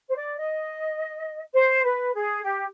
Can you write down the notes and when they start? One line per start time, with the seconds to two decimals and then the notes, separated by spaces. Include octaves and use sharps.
0.09 C5
0.15 D5
0.37 D#5
1.53 C5
1.83 B4
2.14 G#4
2.43 G4